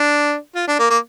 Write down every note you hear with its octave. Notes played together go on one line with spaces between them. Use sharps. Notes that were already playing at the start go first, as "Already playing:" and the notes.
Already playing: D4
F4
D4
A#3
A#3